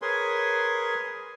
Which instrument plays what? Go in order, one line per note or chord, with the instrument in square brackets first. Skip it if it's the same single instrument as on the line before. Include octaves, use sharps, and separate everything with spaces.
[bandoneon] G#4 A#4 B4 C#5 G#5 C6